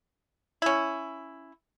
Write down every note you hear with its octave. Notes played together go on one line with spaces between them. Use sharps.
C#4 E4